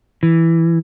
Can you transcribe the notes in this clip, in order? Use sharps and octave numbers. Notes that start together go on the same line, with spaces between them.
E3